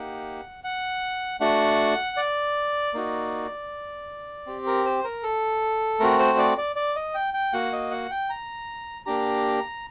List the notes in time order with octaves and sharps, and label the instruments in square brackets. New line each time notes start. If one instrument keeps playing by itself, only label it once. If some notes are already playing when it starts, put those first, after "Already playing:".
Already playing: [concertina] A#3 D#4 G4 F#5
F#5
A3 D4 F#4 F#5
D5
A#3 D#4 F#4
C4 G4
A#4
C5
A#4
A4
A3 C4 F#4 A#4
C5
D5
D5
D5
D#5
G5
G5
A#3 F#4 F#5
D#5
F#5
G5
A#5
A#3 D4 G4 A#5